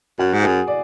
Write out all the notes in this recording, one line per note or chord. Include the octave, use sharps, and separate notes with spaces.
F#2 F#4
G#2
F#2 G#4
D5